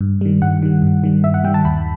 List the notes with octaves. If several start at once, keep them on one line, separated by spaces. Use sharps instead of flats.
G2
D#3 G3
G2 F#5
D#3 G3
G2
D#3 G3
G2 E5
F#5
D#3 G3 G5
A5
D#2 B5